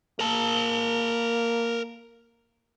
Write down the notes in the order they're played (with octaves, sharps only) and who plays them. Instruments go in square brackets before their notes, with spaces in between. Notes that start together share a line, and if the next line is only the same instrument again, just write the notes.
[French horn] A#3 [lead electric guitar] A#4 A5